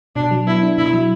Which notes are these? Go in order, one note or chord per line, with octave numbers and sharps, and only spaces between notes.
B2 D4
F#3
B3 E4
D4
B2 E4
F#3